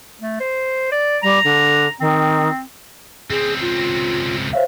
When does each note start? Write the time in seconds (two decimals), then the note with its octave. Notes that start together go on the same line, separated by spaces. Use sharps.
0.21 A3
0.40 C5
0.92 D5
1.23 G3 A#5
1.44 D3
2.00 D#3 C4
3.30 C#2 C4 G#4
3.61 F4
4.53 C5 C#5 E5 F5